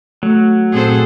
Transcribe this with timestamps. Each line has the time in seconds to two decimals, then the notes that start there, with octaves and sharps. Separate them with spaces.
0.23 F#3 A3
0.72 A#2 C4 G#4 A4 C5